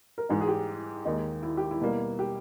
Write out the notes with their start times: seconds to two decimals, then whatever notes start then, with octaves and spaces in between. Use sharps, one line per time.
0.18 A#4
0.29 G#2 E3 G#3 D#4 G#4
0.41 G#4
0.48 G4
1.05 D#2 D#3 G#3 D#4
1.43 E4
1.57 G4
1.71 E4
1.81 B2 G3 A#3
2.19 G4